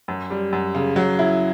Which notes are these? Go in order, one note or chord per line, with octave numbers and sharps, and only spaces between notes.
F#2
G3
F#2
C#3
F#3
E4